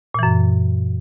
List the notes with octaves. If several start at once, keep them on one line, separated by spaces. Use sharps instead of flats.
F#2 A#2 E3